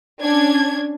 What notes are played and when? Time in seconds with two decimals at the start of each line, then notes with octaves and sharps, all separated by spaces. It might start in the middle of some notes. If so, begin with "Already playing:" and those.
0.22 C#4 D4 G#6